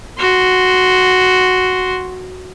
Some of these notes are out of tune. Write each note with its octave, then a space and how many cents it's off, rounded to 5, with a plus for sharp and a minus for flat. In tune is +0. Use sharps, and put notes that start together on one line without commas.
F#4 +0 C6 +0